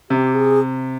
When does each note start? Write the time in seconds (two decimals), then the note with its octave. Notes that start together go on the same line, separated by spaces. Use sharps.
0.10 C3 G4
0.34 G#4